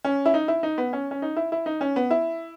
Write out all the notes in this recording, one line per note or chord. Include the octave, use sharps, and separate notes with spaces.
C#4
E4
D#4
E4
D#4
B3
C#4
C#4
D#4
E4
E4
D#4
C#4
B3
E4